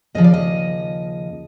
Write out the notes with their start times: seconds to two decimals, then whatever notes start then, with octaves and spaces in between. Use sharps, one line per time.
0.15 D#2 C#3 F3 D#5
0.24 D5
0.34 D#5